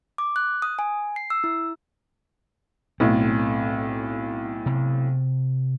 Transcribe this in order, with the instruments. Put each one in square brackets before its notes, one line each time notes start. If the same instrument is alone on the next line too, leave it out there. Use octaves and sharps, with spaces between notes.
[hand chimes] D6
F#6
D#6
G#5
C7
E6
E4
[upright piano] B1 A2 [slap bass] C4
[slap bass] C3